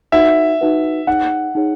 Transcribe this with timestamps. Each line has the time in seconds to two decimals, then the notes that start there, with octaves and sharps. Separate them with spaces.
0.12 D#4 F#4 B4 E5 F#5
0.61 D#4 F#4 B4 F#5
1.07 D#4 G#4 C#5 F#5
1.55 D#4 G#4 C#5